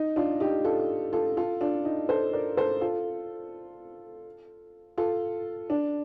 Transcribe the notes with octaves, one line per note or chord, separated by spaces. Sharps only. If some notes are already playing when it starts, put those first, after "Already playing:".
Already playing: D#4
D4 F4
D#4 G4
F4 A4
F4 A4
F4 A4
D4 F4
D#4
A4 C5
A#4 D5
A4 C5
F4 A4
F4 A4
D4